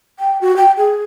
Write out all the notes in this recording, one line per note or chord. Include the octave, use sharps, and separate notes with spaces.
G5
F#4
G5
G#4